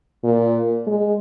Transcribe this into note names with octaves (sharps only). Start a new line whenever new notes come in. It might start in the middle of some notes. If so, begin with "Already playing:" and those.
A#2
G#3